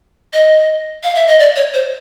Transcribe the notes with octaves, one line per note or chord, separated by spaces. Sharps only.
D#5
F5
E5
D#5
D5
C#5
C5